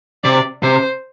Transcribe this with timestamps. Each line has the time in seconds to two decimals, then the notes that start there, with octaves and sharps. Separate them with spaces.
0.24 C3 D5
0.62 C3 C5